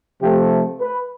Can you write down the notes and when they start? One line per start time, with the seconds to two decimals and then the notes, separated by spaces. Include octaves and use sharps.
0.21 C3 F3 A3 G4
0.81 B4